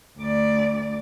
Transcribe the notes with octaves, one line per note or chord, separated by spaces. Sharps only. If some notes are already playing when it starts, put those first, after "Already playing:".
D2 D5